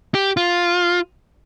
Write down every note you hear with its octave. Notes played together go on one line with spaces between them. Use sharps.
G4
F4